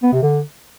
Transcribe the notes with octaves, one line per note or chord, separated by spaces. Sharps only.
B3
C3
D3